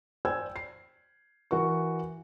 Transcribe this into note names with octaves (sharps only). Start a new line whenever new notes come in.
C5 D5 G5 G#5 E6 G#6
C7
E3 F#4 A#4 C#6